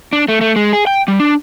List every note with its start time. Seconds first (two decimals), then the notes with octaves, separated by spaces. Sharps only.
0.13 D4
0.28 A3
0.41 A3
0.56 G#3
0.73 G#4
0.87 G5
1.08 G3
1.20 D4